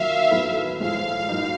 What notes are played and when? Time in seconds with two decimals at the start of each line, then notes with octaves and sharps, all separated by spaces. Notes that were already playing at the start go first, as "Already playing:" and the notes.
Already playing: D#3 F#3 A#3 F4 E5 F5
0.30 A2 F#3 B3 E4 A4
0.79 A2 F3 G#3 F5
1.29 A2 F#3 A#3 D#4